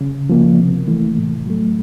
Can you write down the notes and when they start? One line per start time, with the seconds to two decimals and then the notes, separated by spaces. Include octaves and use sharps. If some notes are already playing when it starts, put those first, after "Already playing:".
0.01 C#3
0.29 F3 A#3
0.59 C3
0.88 E3 A3
1.17 A2
1.46 F#3 A3